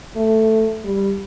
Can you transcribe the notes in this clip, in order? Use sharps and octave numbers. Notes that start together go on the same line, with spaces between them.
A3
G3